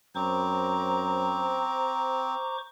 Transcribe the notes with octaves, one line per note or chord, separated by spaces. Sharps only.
F#2 C4 C5 A#5 C#6 D6